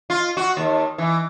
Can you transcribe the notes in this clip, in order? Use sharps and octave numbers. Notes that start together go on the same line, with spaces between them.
F4
F#4
D#2
E3